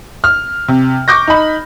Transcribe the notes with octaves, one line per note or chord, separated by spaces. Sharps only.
F6
C3
C#6 D6 G6 A#6
D#4 B5